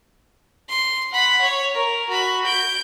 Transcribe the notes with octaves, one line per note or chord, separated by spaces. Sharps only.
C6
F#5 B5
C#5
A#4
F#4 B5
G6 D7